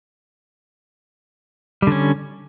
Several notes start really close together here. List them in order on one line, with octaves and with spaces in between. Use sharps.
G3 D3 C#4